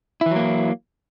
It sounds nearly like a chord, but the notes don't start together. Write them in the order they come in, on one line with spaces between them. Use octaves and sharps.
E4 E3 F#3 A#3